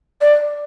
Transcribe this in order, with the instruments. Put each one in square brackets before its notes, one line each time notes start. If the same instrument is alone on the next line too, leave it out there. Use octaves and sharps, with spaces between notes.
[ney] D5